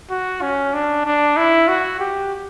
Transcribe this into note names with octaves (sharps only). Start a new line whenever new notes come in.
F#4
C#4
D4
D4
E4
F#4
G4